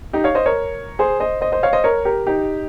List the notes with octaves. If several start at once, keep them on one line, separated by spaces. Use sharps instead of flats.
D#4 G4
C#5 F5
C5 D#5
A#4 C#5
G#4 C5
C5 D#5
C5 D#5
C5 D#5
C#5 F5
C5 D#5
A#4 C#5
G4 A#4
D#4 G4